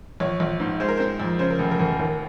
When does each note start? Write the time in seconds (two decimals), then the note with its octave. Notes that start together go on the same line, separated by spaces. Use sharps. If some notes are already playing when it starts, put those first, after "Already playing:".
0.20 A#1 C#5
0.40 A#1
0.60 G#2
0.80 G#3 C5
0.89 A#4
0.97 C4 C5
1.20 F2
1.39 C#3 C5
1.50 A#4
1.59 F1
1.71 A#4
1.79 F1
1.99 D#2 A#4